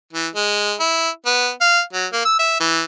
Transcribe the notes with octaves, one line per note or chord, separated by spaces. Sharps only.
E3
G#3
E4
B3
F5
F#3
A#3
E6
E5
E3